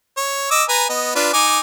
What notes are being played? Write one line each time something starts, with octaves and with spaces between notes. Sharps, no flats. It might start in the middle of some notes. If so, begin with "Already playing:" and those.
C#5
D#5 D6 E6
B4 G#5 A#5
B3 D#5
D4 F4 B4
D#4 G#5 D6